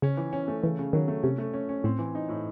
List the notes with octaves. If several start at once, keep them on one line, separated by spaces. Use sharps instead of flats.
C#3 C#4
E3
C#4
A3
C#3 E3
C#3
D#3 F#3
A3
C3 C#4
A3
C#4
C#4
A2 C4
E3
D#4
A2